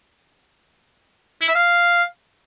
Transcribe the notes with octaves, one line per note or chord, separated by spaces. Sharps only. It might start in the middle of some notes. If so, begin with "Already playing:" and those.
E4
E5
F5